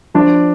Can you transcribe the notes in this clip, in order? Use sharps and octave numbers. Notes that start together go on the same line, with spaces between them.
F3 D4